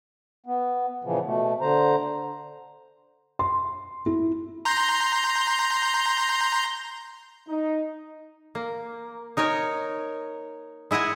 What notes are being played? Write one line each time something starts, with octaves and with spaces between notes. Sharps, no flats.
B3
A#2 C#3 E3 F3
B2 A3
D3 C5 A#5
C6
E4
A#5 C6 G6
D#4
A#3
D#4 A#4 C#5 G#5
G#3 E4 D#5 F#5 G#5